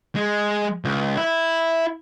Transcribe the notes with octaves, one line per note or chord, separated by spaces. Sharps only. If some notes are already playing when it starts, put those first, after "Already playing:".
G#3
C#2
E4